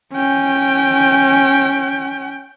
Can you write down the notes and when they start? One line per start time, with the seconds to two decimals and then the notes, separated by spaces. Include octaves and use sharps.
0.13 C#4 G5